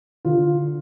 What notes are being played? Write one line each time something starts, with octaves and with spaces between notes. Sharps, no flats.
D3 F4